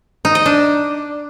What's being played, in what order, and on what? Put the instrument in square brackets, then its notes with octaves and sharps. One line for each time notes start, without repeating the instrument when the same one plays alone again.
[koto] D#4
D#5
D4